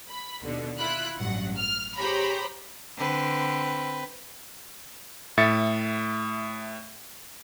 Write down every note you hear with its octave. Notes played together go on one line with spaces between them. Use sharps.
B5
D#2 B2 D3
E4 F4 B5 F#6
A1 G2 F#3 F#5
F6
G4 G#4 C5 C#5 A#5 B5
D3 C4 B4
A2 E5 A6 C#7